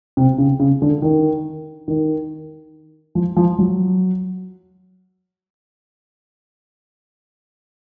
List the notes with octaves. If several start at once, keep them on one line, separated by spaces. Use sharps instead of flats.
C3
C#3
C#3
D3
D#3
D#3
F3
F3
F#3